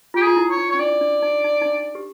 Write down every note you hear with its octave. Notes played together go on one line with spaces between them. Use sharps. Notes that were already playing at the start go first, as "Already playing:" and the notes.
F4 G4
G#4
F4
E4
C#5
D#4
C#4 C#5
D4 D5
D4
D#4
D#4
D#4
D4
G4